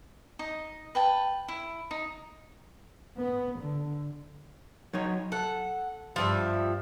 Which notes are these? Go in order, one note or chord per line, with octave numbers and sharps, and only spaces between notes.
D#4 D#5
B4 G5 A5
E4
D#4
B3
D3
F#3 D#4 C#5
A4 F#5
G2 F3 G3 E5